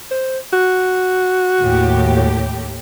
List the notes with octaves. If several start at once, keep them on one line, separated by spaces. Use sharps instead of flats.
C5
F#4
D#2 A2 G4